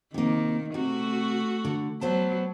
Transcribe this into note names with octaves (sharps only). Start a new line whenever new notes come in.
C3 D#3 A#3
C3 A3 F#4
D3
F#3 B3 C5 A5